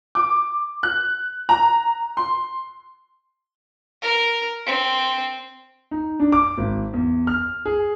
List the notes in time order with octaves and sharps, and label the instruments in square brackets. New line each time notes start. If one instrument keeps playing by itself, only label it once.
[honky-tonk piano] D6
F#6
A#5
C6
[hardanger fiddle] A#4
C4
[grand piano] D#4
D4
D6
G#1
E2
F6
G#4